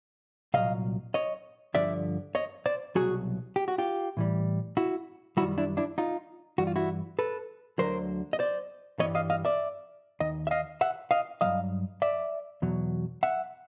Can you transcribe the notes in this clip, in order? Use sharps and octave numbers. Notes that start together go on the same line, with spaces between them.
C2 A#2 F#3 D#5 F5
C#5 D#5
G2 D3 F3 D5 E5
C#5 D#5
C5 D5
C2 B2 F#3 F#4 G#4
G4
F#4
F4 G4
A2 E3 G3
E4 F#4
F#2 D#3 G3 E4 F#4
D4 E4
D4 E4
D#4 F4
G2 E3 G3 F#4
F4
E4 F#4
A4 B4
D2 D3 F#3 A#4 C5
D#5
C5 D5
G2 E3 G3 C#5 D#5
D#5 F5
D#5 F5
D5 E5
D#2 D#3 D#5
E5
D#5 F5
E5 F#5
D#5 F5
G2 D#3 F#3 D#5 F5
D5 E5
E2 B2 F#3
E5 F#5